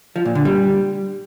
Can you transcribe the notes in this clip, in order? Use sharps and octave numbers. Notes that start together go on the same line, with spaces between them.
F3
A#2
D3
G3